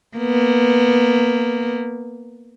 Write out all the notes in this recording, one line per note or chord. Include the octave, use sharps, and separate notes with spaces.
A#3 B3